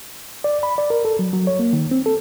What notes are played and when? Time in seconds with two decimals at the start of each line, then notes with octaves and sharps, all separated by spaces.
0.44 D5
0.63 B5
0.78 D5
0.90 A#4
1.05 A4
1.19 F#3
1.33 F#3
1.47 C#5
1.59 A#3
1.73 D#3
1.91 C4
2.06 A4